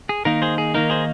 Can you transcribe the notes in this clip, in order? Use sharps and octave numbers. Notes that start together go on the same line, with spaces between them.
G#4
D#3 A#3 D#4 A#4
G#4 C5
G#4
D#3 A#3 D#4 A#4
G#4 C5